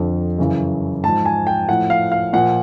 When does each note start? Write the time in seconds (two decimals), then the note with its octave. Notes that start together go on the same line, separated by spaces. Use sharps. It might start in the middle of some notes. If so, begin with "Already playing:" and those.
Already playing: F2 D3 F3
0.39 F#2 C#3 E3
1.03 G#2 F3 A5
1.25 G#5
1.47 G5
1.68 A2 F3 F#5
1.90 F5
2.12 F5
2.33 A#2 F3 F#5